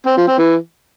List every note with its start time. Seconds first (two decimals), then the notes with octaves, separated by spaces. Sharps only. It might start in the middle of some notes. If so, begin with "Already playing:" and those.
0.06 C4
0.17 F3
0.28 C4
0.38 E3